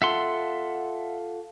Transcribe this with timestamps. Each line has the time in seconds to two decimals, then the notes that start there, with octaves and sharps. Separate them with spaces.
0.02 F4 A4 E5 F#5 C6